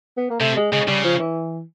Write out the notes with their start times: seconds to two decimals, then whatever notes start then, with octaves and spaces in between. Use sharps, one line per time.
0.17 B3
0.30 A#3
0.40 C3 A3
0.56 G#3
0.72 C#3 G#3
0.88 C#3 G3
1.04 F3
1.19 E3